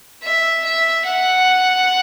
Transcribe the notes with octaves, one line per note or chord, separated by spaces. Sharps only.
E5
E5
F#5